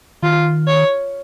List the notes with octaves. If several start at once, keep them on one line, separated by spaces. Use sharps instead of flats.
D#3 F4
C#5